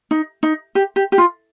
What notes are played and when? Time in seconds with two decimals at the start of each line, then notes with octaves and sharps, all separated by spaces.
0.11 D#4
0.43 D#4
0.75 G4
0.96 G4
1.12 G4
1.18 F4